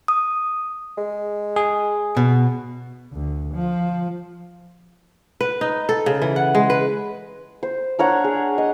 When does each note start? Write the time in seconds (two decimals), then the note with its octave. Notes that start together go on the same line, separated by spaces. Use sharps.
0.08 D#6
0.98 G#3
1.56 G#4
2.17 B2
3.13 D2
3.54 F3
5.41 B4
5.61 D#4
5.89 A4
6.06 C#3
6.22 E3
6.36 F#5
6.55 G#3
6.70 B4
7.63 C5
7.99 D4 A#4 C#5 F#5
8.24 G#4
8.58 D#5